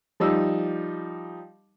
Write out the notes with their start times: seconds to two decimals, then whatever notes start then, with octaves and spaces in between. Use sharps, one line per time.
0.20 F3 G3 D#4 E6